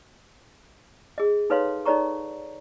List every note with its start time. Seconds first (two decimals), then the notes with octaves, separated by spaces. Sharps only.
1.18 G#4 D#5
1.50 D#4 A4 B4 C#5 F5 C6
1.85 D#4 A4 C#5 D5 A#5 C#6